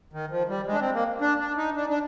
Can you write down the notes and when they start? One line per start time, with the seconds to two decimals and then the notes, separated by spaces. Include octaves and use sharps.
0.13 D#3
0.30 F3
0.49 G3
0.67 G#3
0.73 D4
0.81 C4
0.94 A#3
1.21 D4
1.40 D4
1.57 D#4
1.76 D4
1.89 D4